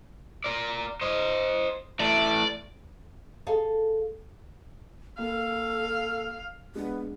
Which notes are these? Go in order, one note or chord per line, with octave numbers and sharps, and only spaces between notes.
A#4 D5
C5 D#5
E3 A3 D5
G#4 A4 F5
A#3 A4 F5
G#3 B3 D4 G#4